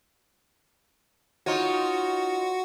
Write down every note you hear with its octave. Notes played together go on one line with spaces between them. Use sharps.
D#4 F4 F#4 C#5